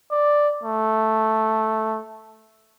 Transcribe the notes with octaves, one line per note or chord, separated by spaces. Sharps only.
D5
A3